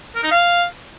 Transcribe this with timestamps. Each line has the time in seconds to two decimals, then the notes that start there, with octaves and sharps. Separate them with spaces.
0.15 A#4
0.23 D#4
0.31 F5